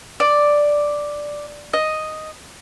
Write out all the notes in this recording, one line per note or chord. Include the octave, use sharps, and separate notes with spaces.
D5
D#5